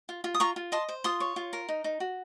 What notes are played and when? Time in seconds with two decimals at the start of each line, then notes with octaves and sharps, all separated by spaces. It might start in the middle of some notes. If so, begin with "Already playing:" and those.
0.09 F4
0.24 F4
0.34 D#6
0.40 F4 A#5 C#6
0.56 F4
0.72 D#5 A5 C6
0.89 C5
1.04 F4 C6 D#6
1.20 C#5
1.36 F4
1.53 A#4
1.69 D#4
1.84 D#4
2.00 F#4